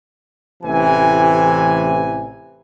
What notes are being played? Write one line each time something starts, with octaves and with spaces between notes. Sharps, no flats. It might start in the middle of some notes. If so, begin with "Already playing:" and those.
A1 C3 E3 G#5